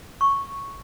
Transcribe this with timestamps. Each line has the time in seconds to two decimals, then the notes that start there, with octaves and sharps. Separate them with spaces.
0.21 C#6